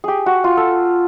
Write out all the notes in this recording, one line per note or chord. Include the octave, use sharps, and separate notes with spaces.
G4 G#4
F#4
F4
A4